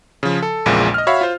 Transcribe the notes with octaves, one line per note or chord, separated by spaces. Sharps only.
C#3 F3
A4
A#1 E2 A#2 C#3 G#3 A#3
D#5 F6
F#4 C#5 E5 F5 B5
F4 C5